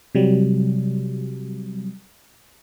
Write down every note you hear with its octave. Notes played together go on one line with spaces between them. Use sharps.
C3 F#3 G3